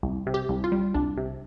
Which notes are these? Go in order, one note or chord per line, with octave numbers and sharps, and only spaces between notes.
C2
C3
G4
C2
F4
G3
C2 D4
C3